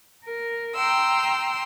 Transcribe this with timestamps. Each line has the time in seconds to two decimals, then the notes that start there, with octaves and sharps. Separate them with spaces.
0.25 A#4
0.75 G5 A#5 C6 E6